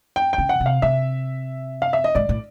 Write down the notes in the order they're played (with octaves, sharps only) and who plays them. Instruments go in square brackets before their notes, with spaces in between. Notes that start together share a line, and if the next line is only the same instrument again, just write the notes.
[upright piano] G5
G5
[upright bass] C#3
[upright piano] F#5
[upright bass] C3
[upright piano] F5
[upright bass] C3 [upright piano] E5
[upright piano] F5
E5
D#5
[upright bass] G#2 [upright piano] D5
[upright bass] A2